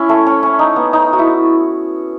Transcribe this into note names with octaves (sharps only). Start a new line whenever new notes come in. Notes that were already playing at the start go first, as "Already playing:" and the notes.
Already playing: C#4 E4
A3
C#4
C#4
D#4
B3
D#4
F#4
E4